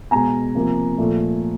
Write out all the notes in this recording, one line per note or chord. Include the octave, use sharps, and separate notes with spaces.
B2 G#3 B3 G#5 A#5
C3 F3 A#3
A#2 F3 A3